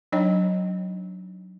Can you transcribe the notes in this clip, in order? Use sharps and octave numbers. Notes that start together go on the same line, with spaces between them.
F#3 D4 D#4 C#5 D#5 G5